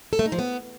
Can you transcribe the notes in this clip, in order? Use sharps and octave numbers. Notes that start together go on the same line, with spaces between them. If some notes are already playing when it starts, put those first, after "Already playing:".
A4
A3
D#4
F3
B3